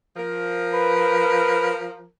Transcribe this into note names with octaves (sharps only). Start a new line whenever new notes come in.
F3 A#4
B4